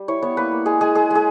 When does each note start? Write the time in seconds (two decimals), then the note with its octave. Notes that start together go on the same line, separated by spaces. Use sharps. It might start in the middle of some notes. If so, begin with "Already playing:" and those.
Already playing: G3
0.08 E4 C#5
0.22 B3 C#5
0.37 A#3 B4
0.52 A#3
0.66 G#3 G#4
0.81 G#3 G#4
0.95 G#3 G#4
1.10 G#3 G#4